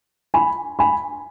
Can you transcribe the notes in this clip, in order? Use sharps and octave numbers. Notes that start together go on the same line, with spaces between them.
G#5 B5
G#5 B5